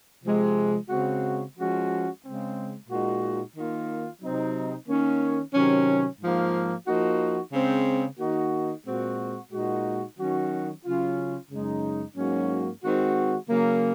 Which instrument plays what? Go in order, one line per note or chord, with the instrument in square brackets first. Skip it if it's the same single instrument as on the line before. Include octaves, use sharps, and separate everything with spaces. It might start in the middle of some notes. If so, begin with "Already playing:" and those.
[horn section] C3 F3 G#3
C#3 G#3 C4 F#4
F3 G#3 C#4 F#4
C#3 G#3 C4
A#2 G#3 D#4 F#4
D#3 A#3 F4
C3 F#3 C4 D#4
D#3 A#3 C#4
C3 D#3 F#3 C#4
G#2 F3 A#3
F3 A#3 D#4 F#4
C#3 G#3 C4
D#3 A#3 D#4 F#4
A#2 G#3 C4 F#4
A#2 G#3 D#4 F#4
D#3 F#3 C#4 F#4
C#3 F#3 C#4 F4
F#2 C#3 G#3 D#4
G#2 F#3 A#3 C#4 F#4
D#3 G#3 C4 F#4
C#3 F#3 A#3